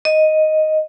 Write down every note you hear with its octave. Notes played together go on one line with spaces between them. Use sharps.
D#5